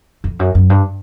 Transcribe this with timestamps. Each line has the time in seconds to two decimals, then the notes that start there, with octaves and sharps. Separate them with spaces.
0.24 F2
0.39 F#2
0.55 F#2
0.70 G2